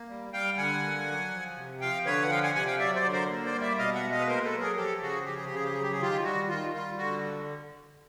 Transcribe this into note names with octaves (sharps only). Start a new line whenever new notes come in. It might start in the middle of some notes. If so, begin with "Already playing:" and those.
Already playing: A#3
G3
G3 F5 G5
D3 F#5 G#5
A#3
F#3
F3
C3
F3 F5 G5
D3 B4 C#5
F#5
F3 F5 G5
F#5 G#5
C3 F#5 G#5
F5 G5
F#3 D5 E5
C5 D5
D3
A#4 C5
A#3
C5 D5
G3
D5 E5
B2 D#5 F5
E5 F#5
G#3
D#5 F5
B4
A#3 A#4 C5
A4 B4
F#3
G#4 A#4
F3 G4 A4
C#3 F#4 G#4
F3 G4
G#4
G4
C#3 G#4
G4
F#3 G#4
G4
G#4
D#3 F4 G4
G3 F#4
D#3 F4
G3 F4
D3 F#4